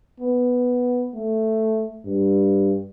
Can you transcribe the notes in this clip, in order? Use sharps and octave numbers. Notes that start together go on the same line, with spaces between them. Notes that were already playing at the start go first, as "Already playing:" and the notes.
B3
A3
G2